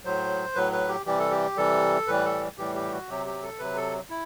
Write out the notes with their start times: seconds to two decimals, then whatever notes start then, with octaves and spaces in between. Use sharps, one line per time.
0.05 A2 F#3 C5
0.55 A2 F#3 B4
0.72 B4
0.89 G4
1.06 C3 E3 G3 G4
1.19 A4
1.31 G4
1.57 C3 E3 G3 A4
2.07 A2 E3 G3 B4
2.25 A4
2.58 A2 E3 G3 G4
2.75 G4
2.92 F#4
3.09 C3 F#3 G4
3.26 G4
3.43 A4
3.59 C3 F#3 B4
3.76 A4
4.10 E4